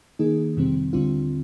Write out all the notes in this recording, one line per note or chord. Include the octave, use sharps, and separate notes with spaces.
D#3 A#3 D#4 G#4
F2 C3 D#3 G3 C4
D#2 D3 G3 C4 F4